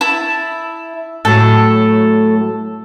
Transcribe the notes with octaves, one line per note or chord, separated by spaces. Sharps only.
E4 A5
A2 F#3 A4